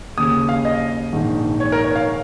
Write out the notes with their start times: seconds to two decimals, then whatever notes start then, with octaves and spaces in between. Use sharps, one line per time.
0.17 D#2 C#3 D#6
0.49 F5
0.65 D#5
1.13 A#1 G#2 D#3
1.60 C#5
1.72 A#4
1.84 C#5
1.96 F5